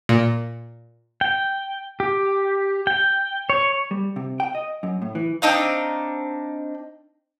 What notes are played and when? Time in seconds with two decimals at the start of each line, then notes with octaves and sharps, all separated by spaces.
0.09 A#2
1.21 G5
2.00 G4
2.87 G5
3.50 C#5
3.91 G3
4.16 C3
4.40 G5
4.55 D#5
4.83 F#2
5.02 A2
5.15 E3
5.42 C4 D4 D#4 F5